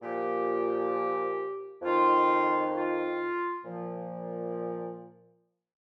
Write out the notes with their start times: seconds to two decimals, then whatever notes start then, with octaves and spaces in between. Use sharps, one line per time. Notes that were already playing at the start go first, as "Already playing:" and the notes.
0.01 A#2 F3 G4
1.82 F2 D#3 F4
2.74 F4
3.64 A#2 F3